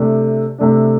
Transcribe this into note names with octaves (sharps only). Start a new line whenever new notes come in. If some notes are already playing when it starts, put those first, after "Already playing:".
Already playing: C3 A3 D4
C3 A3 D4